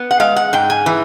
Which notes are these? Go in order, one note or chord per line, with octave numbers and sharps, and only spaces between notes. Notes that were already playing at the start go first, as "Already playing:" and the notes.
Already playing: B3
F#5
G#3 F5
F#5
G#2 G5
G#5
E3